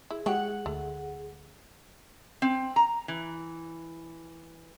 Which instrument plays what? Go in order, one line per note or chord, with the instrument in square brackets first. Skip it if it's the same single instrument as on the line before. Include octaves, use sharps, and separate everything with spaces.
[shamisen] E4 [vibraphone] G#4
[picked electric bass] G#3 [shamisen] E4 F#4 G4 [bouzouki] F#5
[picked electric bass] D2 [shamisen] A3
[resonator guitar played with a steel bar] C4
A#5
E3